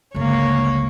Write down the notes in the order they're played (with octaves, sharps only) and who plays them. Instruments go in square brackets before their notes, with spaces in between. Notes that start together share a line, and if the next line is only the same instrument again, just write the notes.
[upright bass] G1 C#2 [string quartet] A#3 C#5